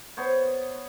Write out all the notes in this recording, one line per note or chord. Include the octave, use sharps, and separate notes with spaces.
B3 C5 C#5